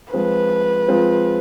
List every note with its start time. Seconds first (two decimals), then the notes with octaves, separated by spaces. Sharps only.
0.13 F3 G#3 C4 F4 B4
0.88 F3 G#3 C4 F4